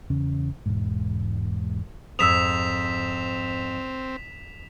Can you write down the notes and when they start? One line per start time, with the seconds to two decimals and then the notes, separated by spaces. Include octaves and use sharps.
0.10 E2 C#3 C#4
0.66 E1 G#2
2.19 F2 G#2 C4 D#6 E6 B6 E7 F7